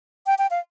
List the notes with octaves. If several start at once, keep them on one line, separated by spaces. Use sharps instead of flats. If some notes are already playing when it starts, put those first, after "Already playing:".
G5
G5
F5